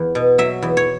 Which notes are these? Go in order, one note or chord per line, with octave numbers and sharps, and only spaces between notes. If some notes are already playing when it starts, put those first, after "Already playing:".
Already playing: E2
B2
F#3 E5
E2
C#5